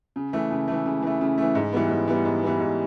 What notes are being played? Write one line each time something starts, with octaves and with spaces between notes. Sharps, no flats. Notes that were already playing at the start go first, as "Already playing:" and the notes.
C#3
E3 A3
C#3
E3 A3
C#3
E3 A3
C#3
E3 A3
G#2
E3 G3 B3
G#2
E3 G3 B3
G#2
E3 G3 B3
G#2